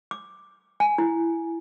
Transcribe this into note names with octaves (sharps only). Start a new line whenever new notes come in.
D6
G#5
E4